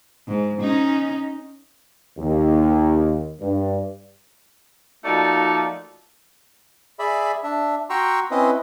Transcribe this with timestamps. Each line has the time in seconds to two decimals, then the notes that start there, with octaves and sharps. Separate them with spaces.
0.28 G#2
0.61 C#4 D#4
2.18 D#2
3.40 G2
5.04 F3 A3 A#3 D#4 F#4 D5
6.99 G#4 D5 E5 B5
7.44 D4 E5
7.90 F#4 G5 A#5 C6 C#6 E6
8.31 C4 C#4 E4 B4 D#5